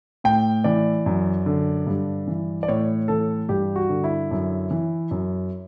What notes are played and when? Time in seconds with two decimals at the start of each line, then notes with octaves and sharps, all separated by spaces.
0.24 A2 G5
0.64 E3 D5
1.06 F#2
1.46 D3
1.87 G2
2.27 E3
2.63 D5
2.68 A2 C#5
3.08 E3 A4
3.49 G2 G4
3.76 F#4
3.89 D3
4.04 E4
4.31 F#2
4.71 E3
5.11 F#2